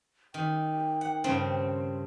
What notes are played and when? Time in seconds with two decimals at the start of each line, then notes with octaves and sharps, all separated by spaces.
0.34 D#3 G5
1.01 F#5
1.24 G2 C#3 C4